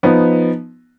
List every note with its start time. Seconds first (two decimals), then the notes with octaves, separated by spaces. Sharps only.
0.03 F3 B3 D#4